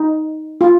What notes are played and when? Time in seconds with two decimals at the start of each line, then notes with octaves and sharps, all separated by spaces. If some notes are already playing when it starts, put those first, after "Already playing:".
Already playing: D#4
0.61 F4